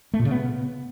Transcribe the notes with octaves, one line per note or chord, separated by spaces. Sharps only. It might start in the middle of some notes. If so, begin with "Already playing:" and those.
A3
A#2
C#3
B3